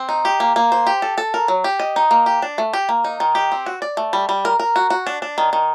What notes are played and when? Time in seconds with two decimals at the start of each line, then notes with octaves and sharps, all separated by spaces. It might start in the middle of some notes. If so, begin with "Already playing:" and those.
Already playing: C4
0.09 D#4
0.25 G4
0.40 A#3
0.56 A#3
0.72 C5
0.87 G4
1.02 A4
1.18 A4
1.34 A#4
1.48 F#3
1.64 G4
1.80 D#5
1.96 D#4
2.11 A#3
2.26 G4
2.42 D4
2.58 A3
2.73 G4
2.89 A#3
3.05 D#4
3.20 D#3
3.35 G4
3.52 C4
3.66 F#4
3.82 D5
3.97 A3
4.13 G3
4.29 G3
4.45 A#4
4.60 A#4
4.76 F#4
4.90 F#4
5.07 D4
5.22 D4
5.38 D#3
5.53 D#3